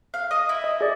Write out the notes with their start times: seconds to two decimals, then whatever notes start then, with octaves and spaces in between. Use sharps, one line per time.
0.14 F5
0.31 D#5
0.49 E4
0.64 D#5
0.81 G#4 D5